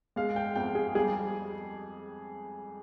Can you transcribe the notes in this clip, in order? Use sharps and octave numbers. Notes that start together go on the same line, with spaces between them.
G#3 F5
G5
F2 G5
G#4
G3 G#4